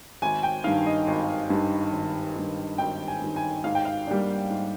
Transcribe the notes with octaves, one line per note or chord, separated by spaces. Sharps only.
G#1 G#5
G5
G2 D#3 F5
D#5
G#1
G2 D#3
G#1
G2 D#3
G#1 G5
G#5
G2 D#3
G#5
G#2 F5
G5
F5
G3 A#3 D4
G#2